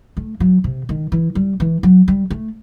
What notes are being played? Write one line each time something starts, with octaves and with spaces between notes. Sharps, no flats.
A3
F#3
C3
D#3
E3
G3
E3
F#3
G3
A3